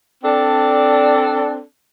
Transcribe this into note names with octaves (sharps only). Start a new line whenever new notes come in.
C4 D4 A4 D5